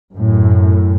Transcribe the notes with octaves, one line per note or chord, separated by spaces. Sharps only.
F#2 A2